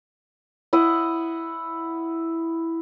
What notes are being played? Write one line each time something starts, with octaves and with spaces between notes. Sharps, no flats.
E4 D#5 F#5